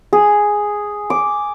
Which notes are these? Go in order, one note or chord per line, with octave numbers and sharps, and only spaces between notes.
G#4
D6